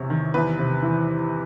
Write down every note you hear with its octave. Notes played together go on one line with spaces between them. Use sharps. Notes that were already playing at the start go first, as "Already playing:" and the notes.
Already playing: E2 C3 E3 C#5
D#3
E2 B4
C3
E3